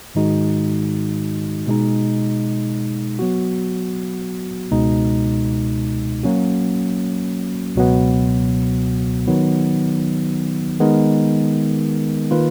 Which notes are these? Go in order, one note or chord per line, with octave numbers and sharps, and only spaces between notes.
G#2 D#3 G#3 D#4 F#4
B2 G#3 D#4
F#3 B3 F#4
C#2 B2 G#3 D#4
F#3 A#3 C#4 F#4
C#2 B2 F#3 B3
D#3 F#3 B3 D#4
D#3 G#3 B3 D#4 A#4
D#3 A#3 F4 B4